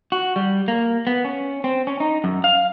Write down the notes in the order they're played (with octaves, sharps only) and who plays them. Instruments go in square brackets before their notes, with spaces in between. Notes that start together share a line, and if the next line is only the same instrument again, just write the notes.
[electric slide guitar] F#4
G3
A#3
B3
C#4
C4
C#4
D#4
F#2
F5